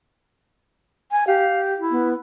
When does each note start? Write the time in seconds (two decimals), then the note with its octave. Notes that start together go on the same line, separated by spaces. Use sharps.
1.11 G#5
1.27 G4 F5
1.79 E4
1.91 B3